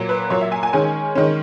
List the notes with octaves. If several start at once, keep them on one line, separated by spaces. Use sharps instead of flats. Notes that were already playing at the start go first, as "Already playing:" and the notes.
Already playing: A#2 F#3 A#3
B4
A#2 F#3 A#3 C#5
E5
G#5
G#5
D#3 G#3 C#4 G#5
D#3 G#3 C#4